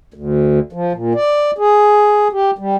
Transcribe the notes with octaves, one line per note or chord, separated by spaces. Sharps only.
D2
F3
A#2
D5
G#4
G4
G3